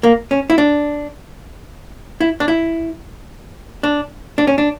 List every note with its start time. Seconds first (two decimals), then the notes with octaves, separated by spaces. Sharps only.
0.03 A#3
0.31 C#4
0.50 E4
0.58 D4
2.20 E4
2.40 D4
2.48 E4
3.83 D4
4.38 D4
4.47 C#4
4.58 D4